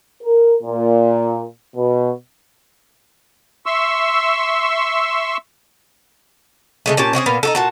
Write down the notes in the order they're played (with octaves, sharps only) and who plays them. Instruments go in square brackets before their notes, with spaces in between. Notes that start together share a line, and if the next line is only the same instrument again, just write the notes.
[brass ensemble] A#4
A#2
B2
[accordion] E5 C6 C#6 E6
[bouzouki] C#3 G#3 A3
A#2 C#4 G4 A5
C4 C#4 F#4 G#4
A#2 B3 F5
D#4 F#4 A4
A#2 F#4 A5